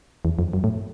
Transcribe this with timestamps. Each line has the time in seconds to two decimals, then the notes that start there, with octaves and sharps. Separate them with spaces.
0.25 E2
0.39 F2
0.53 F#2
0.64 A2